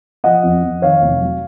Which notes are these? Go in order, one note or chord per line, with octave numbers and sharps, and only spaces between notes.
F3 D#5 F#5
F2
F2
D#3 C#5 F5
F1
F#3